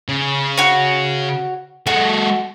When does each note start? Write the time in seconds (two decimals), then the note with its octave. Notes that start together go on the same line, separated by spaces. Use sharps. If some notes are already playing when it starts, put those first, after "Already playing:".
0.08 C#3
0.58 F#4 C#5
1.87 G#3 F#4 A4